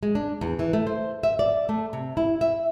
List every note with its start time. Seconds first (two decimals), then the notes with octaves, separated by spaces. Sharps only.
0.03 G#3
0.15 D4
0.41 E2
0.59 E3
0.73 A3
0.87 C5
1.23 E5
1.39 D5
1.69 A3
1.93 C3
2.17 E4
2.41 E5